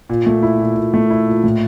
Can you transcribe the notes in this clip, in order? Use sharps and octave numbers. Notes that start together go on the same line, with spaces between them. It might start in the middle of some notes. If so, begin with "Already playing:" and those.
A#2
A3
E4
A#2
A#2
A3
E4
A#2
A2